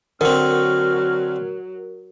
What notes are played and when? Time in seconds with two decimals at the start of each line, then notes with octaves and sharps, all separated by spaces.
0.21 D3 F#3 C4 F#4 A#4 F6